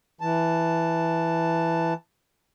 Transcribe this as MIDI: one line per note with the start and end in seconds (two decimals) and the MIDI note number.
0.21 1.94 52
0.21 1.94 81